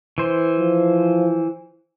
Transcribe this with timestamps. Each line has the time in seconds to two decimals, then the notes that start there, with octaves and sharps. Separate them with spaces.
0.18 E3 C5
0.60 F3